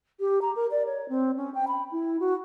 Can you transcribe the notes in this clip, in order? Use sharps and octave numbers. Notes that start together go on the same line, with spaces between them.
G4
A#5
A#4
D5
C#5
C4
C#4
G5
B5
E4
F#4